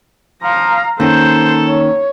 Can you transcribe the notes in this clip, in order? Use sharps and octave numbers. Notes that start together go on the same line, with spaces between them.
F3 F5 A#5
D#3 A#3 C#4 D#4 A4 C5
C#5